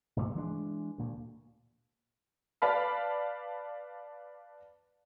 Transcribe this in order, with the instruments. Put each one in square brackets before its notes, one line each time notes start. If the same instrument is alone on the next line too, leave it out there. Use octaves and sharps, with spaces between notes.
[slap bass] G#1 G2 A#2 A3
E3 G#3 C4 D4
D2 A#2
[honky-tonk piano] B4 D5 F5 A5 B5 F6